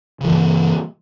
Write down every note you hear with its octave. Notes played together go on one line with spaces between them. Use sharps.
G2 C#3 E3